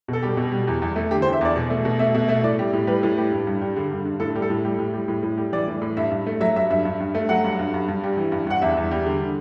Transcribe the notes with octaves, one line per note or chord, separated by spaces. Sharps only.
B2 A4
G3 G4
B2
G3
E2
E2
A3
D3 G4
C5
E2
E5
E2 D5
B2
A3
B2
A3 E5
B2 E5
A3 E5
A2 D5
G3
A2
G3 B4
A2
G3
G2
G2
G3
D3
G2
G2
A2 A4
G3
A4
A2
G3
A2
G3
A2
A2
G3
E3 D5
A2
A2
G2 E5
G2
A3
F#3 E5
G2 E5
G2 E5
G2
G2
A3
F#3 F#5
G2
G2
G2
G2
G3
E3
G2
G2 F#5
E2 E5
E2
G3
D3